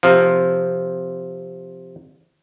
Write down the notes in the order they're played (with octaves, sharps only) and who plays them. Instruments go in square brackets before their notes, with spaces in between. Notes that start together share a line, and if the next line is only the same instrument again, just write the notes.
[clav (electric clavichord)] C3 F3